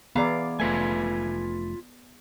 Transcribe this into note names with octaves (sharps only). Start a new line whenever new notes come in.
E3 B3 G#4 D5 F5 A#5
F1 A3 F4 B4 G#5